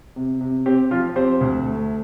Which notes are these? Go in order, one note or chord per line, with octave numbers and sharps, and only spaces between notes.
C3
C3
C4 G4
F3 F4
C4 G4 C5
D2
A3